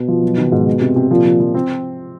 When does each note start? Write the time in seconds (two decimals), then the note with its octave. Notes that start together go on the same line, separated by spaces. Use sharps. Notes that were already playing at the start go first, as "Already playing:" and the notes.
Already playing: B2
0.08 F3
0.23 F#3
0.38 D#3
0.52 G#2
0.66 G#3
0.81 C3
0.96 C3
1.11 A#2 F3
1.25 F3
1.40 F3
1.54 C4